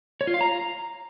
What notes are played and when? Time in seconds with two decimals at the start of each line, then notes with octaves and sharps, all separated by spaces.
0.21 C#5
0.27 F4
0.34 F5
0.41 A#5